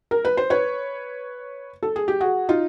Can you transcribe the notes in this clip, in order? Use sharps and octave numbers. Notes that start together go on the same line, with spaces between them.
A#4
B4
C5
B4 C#5
A4
G#4
G4
F#4 G#4
D#4 F4